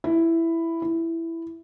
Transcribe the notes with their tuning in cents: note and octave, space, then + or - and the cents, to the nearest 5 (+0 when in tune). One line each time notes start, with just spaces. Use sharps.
E4 +5
E4 +5